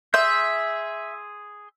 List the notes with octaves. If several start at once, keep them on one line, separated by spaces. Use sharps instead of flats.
G#4 E5 C6 G6